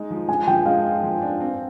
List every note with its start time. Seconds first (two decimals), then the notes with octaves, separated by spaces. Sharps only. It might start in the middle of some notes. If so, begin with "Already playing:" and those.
Already playing: G#3 D#4
0.10 F3
0.28 G#3 G#5
0.47 F3 G5
0.66 G#3 F5
0.85 F4
1.03 F3
1.22 D4
1.41 C4